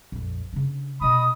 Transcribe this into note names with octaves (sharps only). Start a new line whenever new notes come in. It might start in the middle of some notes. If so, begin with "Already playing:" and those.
A#1 F2
C#3 D4
B2 D#4 D#5 B5 D#6